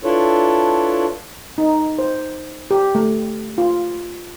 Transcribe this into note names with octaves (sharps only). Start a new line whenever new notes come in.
D4 E4 F4 A4 B4 C#5
D#4
C5
G4
A3
F4